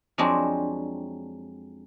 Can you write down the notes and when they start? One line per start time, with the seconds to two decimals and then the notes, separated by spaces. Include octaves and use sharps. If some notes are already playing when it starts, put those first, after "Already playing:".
0.18 F2 F#3 G#3 C4 D4